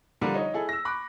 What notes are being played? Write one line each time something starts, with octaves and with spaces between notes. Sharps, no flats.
D3 F3 G3 D4 F4 A#4
D#4 C#5 D#5
E4 G#4 A4
E6 A#6
B5 C#6 D6 F#6